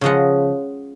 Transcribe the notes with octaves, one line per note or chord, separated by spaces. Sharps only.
C#3 F3 G#3 D#5 F#5